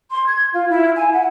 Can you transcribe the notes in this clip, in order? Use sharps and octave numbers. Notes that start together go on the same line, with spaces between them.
C6
G#6
F4
E4
G#5
F#5